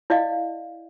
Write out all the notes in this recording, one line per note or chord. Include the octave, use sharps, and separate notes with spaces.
E4 D5 D#5 F5